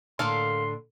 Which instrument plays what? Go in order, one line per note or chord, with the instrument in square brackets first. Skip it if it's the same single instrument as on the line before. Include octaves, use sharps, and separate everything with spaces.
[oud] A2 D3 [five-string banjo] A#3 A4 F5 [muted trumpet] C6